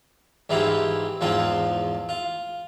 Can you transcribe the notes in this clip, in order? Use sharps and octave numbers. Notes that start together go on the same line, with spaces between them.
G#2 E3 C4 E4 F4 G4
E2 G#2 F3 C4 F4 C6
F4